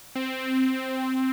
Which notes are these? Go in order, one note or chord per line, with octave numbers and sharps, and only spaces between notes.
C4